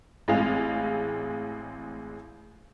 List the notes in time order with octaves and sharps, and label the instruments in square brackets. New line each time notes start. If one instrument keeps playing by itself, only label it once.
[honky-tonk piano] A1 G#3 C4 G#4 F5 F7